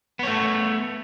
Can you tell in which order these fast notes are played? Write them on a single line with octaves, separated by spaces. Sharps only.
B3 C#5 A3